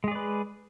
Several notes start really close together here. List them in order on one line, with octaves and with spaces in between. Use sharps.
G#3 G#4 D5 B4